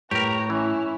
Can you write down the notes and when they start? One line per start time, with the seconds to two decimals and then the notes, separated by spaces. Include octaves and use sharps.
0.11 A2 G4 A#4 B4 C#5 A#5
0.50 E3 C#4 E4